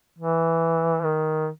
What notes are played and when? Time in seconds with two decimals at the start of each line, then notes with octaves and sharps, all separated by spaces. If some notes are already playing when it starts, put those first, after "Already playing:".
0.19 E3
1.04 D#3